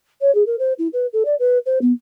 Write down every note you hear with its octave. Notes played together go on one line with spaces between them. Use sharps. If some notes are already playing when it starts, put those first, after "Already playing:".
C#5
G#4
A#4
C5
E4
B4
A4
D5
B4
C5
B3